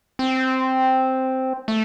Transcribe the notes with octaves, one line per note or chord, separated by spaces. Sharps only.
C4
A3